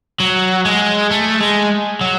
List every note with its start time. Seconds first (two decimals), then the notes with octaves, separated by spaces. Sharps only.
0.20 F#3
0.66 G#3
1.11 A3
1.41 G#3
2.01 F#3